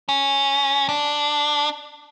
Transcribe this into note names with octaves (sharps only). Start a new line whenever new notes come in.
C#4
D4